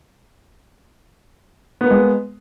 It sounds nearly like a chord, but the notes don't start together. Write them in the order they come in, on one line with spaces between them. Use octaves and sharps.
B3 A#3 G#3